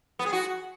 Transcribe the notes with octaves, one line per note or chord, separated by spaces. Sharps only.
B3
G#4
F#4